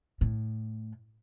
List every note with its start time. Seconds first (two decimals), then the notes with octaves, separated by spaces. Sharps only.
0.21 A2